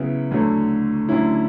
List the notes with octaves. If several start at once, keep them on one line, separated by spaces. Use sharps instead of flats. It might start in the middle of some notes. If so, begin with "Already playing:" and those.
Already playing: C#3 F#3 B3 E4
D2 D3 F#3 A3
D2 D3 F#3 C#4 E4